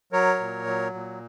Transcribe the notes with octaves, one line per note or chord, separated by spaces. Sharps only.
F#3 A#4 C#5
A#2
F#3
A#2